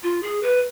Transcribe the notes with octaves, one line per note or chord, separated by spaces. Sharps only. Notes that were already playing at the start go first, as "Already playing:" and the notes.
F4
G#4
B4